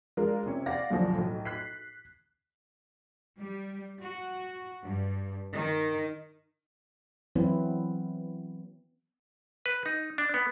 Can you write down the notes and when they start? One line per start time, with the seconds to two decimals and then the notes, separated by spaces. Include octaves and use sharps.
0.17 G#3 D4 F4 A#4
0.46 C3 C#4
0.66 D5 F5 F#5 A#6
0.90 C2 F#2 B2 D3 F3 F#3
1.15 B1 A2
1.45 F#6 B6 C7
3.38 G3
4.02 F#4
4.83 G2
5.54 D#3
7.36 E3 F#3 B3 C4 E4
9.66 B4
9.86 D#4
10.18 D4
10.34 B3